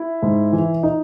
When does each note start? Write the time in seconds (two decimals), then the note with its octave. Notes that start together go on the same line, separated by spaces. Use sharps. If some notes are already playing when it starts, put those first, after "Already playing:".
Already playing: E4
0.22 G#2
0.52 E3
0.83 D#4